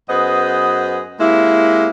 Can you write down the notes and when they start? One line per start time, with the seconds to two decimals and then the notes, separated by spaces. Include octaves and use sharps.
0.09 F#2 B3 G#4 B4 C5 D#5
1.20 C3 G#3 A#3 E4